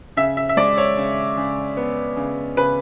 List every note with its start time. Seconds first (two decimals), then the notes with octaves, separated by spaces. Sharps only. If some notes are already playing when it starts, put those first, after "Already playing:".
0.17 C#3 E5
0.37 E5
0.49 E5
0.57 G#3 D5
0.78 C#5
0.97 C#3
1.37 C#3
1.77 B3
2.16 C#3
2.57 C#3 B4